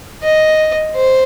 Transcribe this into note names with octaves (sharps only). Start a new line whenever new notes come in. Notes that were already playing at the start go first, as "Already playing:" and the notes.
D#5
C5